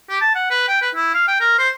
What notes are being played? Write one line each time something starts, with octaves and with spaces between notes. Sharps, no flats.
G4
A5
F#5
B4
G5
B4
E4
F5
G5
A#4
C5